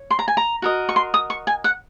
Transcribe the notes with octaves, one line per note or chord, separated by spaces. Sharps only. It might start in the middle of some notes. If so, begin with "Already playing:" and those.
Already playing: C#5
C6
A#5
G#5
A#5
F#4 A#4 D#5
C#6
C6
D#6
C#6
G#5
F#5